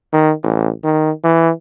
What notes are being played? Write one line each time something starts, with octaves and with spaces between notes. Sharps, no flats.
D#3
A1
D#3
E3